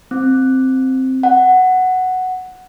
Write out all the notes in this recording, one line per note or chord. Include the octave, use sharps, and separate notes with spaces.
C4
F#5